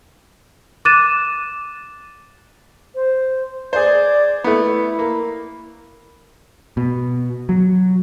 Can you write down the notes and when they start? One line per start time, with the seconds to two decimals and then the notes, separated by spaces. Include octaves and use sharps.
0.85 D6 F#6 A6 D#7 E7
2.95 C5
3.73 G#4 C5 D5
4.44 A3 B3 E4
4.99 A#3
6.77 B2
7.49 F#3